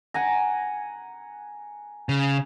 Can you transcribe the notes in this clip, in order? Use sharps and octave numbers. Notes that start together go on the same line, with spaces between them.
F#5 G#5 A#5
C#3